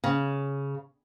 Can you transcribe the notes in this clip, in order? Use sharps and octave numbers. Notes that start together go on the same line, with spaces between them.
C#3